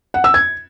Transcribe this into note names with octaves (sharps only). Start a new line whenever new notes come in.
F#5
E6
G#6